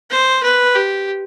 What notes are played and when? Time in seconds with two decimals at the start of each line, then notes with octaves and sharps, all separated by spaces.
0.11 C5
0.43 B4
0.75 G4